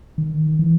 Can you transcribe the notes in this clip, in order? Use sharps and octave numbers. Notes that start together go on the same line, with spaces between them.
D#3
E3